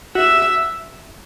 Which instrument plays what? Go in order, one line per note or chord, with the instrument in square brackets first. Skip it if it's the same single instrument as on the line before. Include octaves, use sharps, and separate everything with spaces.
[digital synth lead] F#4 [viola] E5